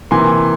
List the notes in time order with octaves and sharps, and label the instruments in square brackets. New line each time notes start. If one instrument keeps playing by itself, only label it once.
[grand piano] C3 E3 A#3 G#5 C6